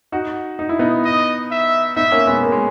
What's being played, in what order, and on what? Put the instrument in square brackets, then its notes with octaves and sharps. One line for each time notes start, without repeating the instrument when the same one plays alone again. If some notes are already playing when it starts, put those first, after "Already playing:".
[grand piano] D#4 F#4
D#4
E4
B3 D#4
[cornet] D#5
E5
[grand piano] B3 D#4 [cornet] E5
[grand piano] A#3 C#4
G#3 B3
A#3
G#3